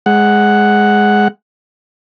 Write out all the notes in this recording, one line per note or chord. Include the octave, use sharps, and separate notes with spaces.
G#3 F#5